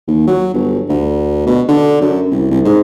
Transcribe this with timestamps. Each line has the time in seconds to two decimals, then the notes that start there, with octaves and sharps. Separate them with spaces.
0.08 D#2
0.27 F#3
0.54 G1
0.89 D2
1.47 B2
1.68 D3
2.01 F#2
2.31 C2
2.50 C2
2.65 G#2